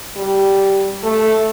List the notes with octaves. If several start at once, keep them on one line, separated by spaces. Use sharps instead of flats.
G3
A3